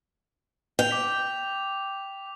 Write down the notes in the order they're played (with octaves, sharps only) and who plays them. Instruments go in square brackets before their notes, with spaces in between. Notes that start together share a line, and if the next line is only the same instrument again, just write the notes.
[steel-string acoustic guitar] G5 [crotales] F7
[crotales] D6 B6